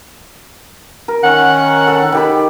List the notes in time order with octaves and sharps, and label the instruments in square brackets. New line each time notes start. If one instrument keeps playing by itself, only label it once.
[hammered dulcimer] A#4
[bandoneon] D#3 C#4 [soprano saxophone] F#5
[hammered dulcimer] A4
D#3 G4 B5